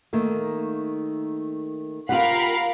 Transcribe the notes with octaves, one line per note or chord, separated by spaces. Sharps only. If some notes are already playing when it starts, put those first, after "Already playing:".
D#3 A3 A#3
F4 G4 A#4 F5 F#5 B5